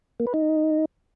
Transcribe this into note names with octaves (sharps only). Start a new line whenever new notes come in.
A#3
B4
D#4